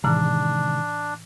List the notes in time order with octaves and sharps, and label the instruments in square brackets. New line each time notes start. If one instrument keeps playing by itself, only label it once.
[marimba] A2 E3 [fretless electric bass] C3 D#3 G#3 [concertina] D4